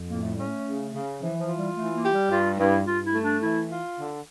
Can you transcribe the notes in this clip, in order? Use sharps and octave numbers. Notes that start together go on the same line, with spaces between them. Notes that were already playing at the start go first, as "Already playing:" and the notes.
Already playing: F2
A2 A#3
A3
G3 C#4
A3
C#3
C#3
E3 F3
F3
F4
G3
E3 A3
A#3
G4
G3
G2 F4
G2 E4
G2 F4
E4
A3
D4
E3 E4
F4
D3